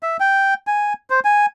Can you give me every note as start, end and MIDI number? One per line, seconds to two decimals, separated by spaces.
0.03 0.17 76
0.20 0.54 79
0.67 0.93 80
1.10 1.20 72
1.25 1.46 80